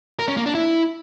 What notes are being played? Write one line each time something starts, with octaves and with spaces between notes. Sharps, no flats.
A#4
C#4
A#3
D4
E4